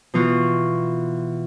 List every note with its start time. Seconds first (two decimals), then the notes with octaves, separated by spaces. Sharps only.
0.14 B2 E3 F4 F#4